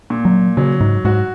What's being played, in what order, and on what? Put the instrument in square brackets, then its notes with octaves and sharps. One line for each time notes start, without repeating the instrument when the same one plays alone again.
[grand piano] A#2
[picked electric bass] F#3
[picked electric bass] C#3 [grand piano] F#3
[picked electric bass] G#2
[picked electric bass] G#2 [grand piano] F#4